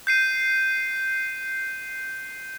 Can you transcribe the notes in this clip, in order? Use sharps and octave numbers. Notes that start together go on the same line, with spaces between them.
G6 C7 D#7